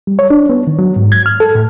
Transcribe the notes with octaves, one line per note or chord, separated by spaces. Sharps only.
G3
C#5
D4
B3
D#3
F#3
G#2
G#6
F6
A4
A2